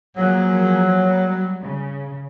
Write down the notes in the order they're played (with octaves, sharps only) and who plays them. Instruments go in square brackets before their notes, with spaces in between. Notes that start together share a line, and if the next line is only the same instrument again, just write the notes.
[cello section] F3 A#3 G#4 [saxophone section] F#3
[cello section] G3
C#3